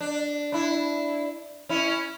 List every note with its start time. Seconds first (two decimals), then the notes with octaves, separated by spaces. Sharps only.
0.01 D4
0.52 D4 E4
1.69 C#4 E4